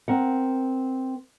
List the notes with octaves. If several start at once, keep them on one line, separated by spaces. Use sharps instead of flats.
C4 A#4 F#5